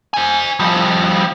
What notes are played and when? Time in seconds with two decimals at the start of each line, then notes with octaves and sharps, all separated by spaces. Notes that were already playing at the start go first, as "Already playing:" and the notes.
0.14 C5 G#5
0.60 F3 G3